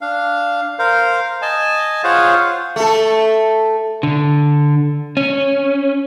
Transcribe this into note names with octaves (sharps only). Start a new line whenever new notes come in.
D4 F5
A#4 C5 F5
D#5 G#5 A5
F4 G#4 C5 C#5 F5 F#5
A3 A4
D3
C#4